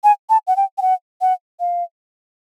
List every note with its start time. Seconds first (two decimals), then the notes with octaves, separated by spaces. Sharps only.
0.04 G#5
0.30 A5
0.47 F#5
0.56 G5
0.78 G5
0.82 F#5
1.21 F#5
1.60 F5